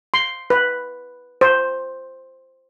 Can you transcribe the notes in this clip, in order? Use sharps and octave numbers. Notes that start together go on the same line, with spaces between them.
C6
B4
C5